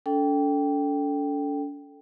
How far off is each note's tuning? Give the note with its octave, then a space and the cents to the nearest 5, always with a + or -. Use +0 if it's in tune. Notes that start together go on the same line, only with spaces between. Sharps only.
D4 -45 A4 +0 G5 +0